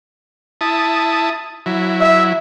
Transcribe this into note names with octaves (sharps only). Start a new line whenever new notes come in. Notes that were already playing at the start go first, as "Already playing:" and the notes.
E4 A5 D#6
F#3 E4
E5